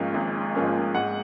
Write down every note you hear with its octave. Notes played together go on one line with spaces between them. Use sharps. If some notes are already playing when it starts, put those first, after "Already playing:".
Already playing: G#1 G#2 F3 A#3 C#4 F5
G#1
G#2 F3 A#3 C#4
G#2 F#5